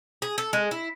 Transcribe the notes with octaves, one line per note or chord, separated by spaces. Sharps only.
G#4
A4
G#3
E4